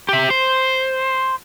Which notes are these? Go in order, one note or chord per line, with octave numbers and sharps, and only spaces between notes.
G4 E5
C5